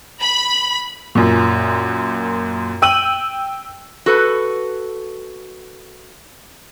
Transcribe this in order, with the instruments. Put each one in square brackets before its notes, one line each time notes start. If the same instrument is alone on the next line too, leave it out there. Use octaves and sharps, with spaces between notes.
[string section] B5
[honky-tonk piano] F#2 A#2
G5 E6 D#7 F#7
[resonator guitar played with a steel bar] F#4 A4 B4